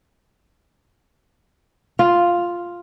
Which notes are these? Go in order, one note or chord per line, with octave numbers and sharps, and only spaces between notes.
F4